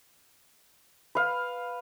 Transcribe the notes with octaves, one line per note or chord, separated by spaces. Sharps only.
B4 F5